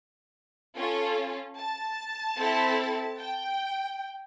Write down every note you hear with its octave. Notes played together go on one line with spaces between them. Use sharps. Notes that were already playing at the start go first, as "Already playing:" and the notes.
C#4 F4 A4
A5
C4 E4 A4
G5